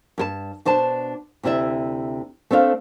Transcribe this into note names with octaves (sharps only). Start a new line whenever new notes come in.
G2 A#4 A5
B2 D4 C5 A5
D2 C3 E4 D5 E5
A3 C4 D4 C#5 F5